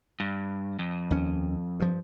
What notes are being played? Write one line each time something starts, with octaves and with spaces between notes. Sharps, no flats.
G2
F2
D#2 C#4
G2 F3